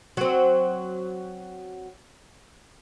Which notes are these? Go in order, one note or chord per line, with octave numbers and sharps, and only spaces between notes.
F#3 C4